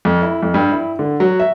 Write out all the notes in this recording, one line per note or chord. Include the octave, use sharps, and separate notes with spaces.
F2
E4
F2
G2
E4
D3
F#3
E5